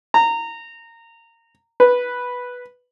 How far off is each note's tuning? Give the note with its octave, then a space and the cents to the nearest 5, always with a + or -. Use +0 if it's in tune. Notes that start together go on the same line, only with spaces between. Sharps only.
A#5 -20
B4 -5